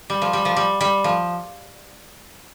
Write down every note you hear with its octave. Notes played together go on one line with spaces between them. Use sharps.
G3
F3
G3
F3
G3
G3
F3